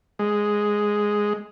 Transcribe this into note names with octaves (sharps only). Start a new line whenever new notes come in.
G#3